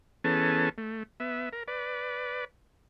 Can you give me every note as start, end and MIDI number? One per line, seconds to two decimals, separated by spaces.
0.24 0.69 52
0.24 0.69 59
0.24 0.69 61
0.24 0.69 68
0.24 0.69 69
0.24 0.69 81
0.78 1.03 57
1.20 1.49 59
1.20 1.49 76
1.53 1.63 70
1.68 2.45 71
1.68 2.45 74